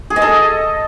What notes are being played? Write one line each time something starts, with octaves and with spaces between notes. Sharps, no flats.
G#4
D#5
A4